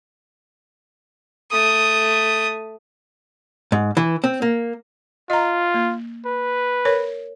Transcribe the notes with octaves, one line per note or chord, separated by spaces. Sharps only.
A3 D#6
G#2
E3
C4
A#3
F4 D#5 A#5
A#3
B4
A#4 C#5